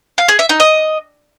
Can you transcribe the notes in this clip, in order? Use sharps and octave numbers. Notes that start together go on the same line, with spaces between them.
F5
G#4
E5
D#4
D#5